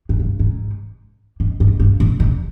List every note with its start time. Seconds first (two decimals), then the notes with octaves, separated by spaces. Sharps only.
0.09 G#2
0.19 G2
0.39 G#2
1.40 G#2
1.60 G#2
1.80 G2
2.00 A#2
2.20 A#2